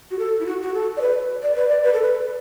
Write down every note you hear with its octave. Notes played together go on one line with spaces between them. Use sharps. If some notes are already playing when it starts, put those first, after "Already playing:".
F#4
A4
E4
F#4
F#4
A4
D5
B4
D5
B4
D5
B4
A4
B4